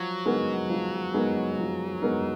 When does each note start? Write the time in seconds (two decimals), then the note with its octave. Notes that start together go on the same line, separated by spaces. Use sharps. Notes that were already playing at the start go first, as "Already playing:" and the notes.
Already playing: F3 F#3
0.26 G#3 B3 D#4 A#4
0.70 F3
1.14 G#3 B3 D#4 A#4
1.59 F3
2.02 G#3 B3 D#4 A#4